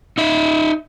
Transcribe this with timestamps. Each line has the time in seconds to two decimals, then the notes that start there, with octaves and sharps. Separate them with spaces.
0.18 D#4 E5